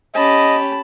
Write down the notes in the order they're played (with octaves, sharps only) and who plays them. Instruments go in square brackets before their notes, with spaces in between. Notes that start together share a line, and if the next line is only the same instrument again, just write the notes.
[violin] C#4 G4 [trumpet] D#5 [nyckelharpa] A5 B5